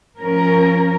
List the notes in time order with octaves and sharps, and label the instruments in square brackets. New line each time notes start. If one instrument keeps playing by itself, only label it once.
[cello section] F3 C#4 A#4